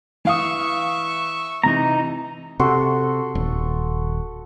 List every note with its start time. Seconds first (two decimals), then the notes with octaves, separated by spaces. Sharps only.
0.25 E3 E5 F5 C#6 D#6
1.64 C3 E3 D#4 A#5
2.60 C3 F#4 A4 C6
3.35 D#1